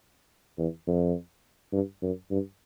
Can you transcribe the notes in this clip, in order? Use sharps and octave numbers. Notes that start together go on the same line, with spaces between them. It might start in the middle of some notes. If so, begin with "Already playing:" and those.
E2
F2
G2
F#2
G2